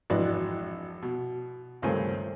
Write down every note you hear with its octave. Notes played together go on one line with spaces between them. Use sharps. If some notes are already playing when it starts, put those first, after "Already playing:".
G#1 F2 E3 D4 F#4 B4
B2
C#2 G2 D#3 A3 C4 G#5